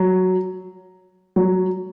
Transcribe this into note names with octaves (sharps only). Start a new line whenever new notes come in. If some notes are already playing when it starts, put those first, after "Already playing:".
Already playing: F#3
F#3